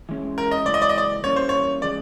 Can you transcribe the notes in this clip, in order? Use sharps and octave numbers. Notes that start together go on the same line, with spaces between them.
E3 G#3 C#4
A#4
D#5
C#3 E3 G#3 D5
D#5
D5
D#5
D5
E3 G3 A#3 C#4 C#5
C5
C#5
C#3 F3 G#3 D5